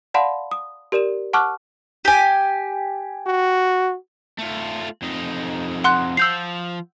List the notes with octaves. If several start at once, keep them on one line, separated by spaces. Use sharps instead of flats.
D5 F5 F#5 A5 B5 C6
D#6
G4 A#4 D5 D#7 E7
F#5 A5 C#6 D6 F6 F#6
G4 G#5
F#4
A3 F4
F2 D#4
F#5 C6 F#6
F3 E6 G6 C7